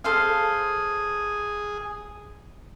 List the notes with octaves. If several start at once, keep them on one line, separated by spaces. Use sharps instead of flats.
G#4 A4 C5 F5